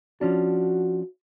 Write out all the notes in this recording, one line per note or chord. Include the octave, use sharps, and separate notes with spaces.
F3 C#4 D4 F#4